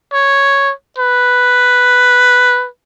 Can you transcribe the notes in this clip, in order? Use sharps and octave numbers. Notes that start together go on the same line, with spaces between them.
C#5
B4